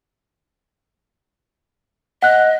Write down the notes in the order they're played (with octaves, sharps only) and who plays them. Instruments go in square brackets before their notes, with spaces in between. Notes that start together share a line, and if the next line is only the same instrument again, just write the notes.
[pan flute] D#5 [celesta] F#5 F#6